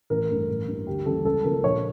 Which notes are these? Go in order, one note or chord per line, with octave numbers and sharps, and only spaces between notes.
A1 A#4
G2 E3 A3
A1
G2 E3 A#3
D2 G4
C#3 E3 G3 A#3 A4
C#2 A4
C#3 F3 A#3 A#4
A#1 C#5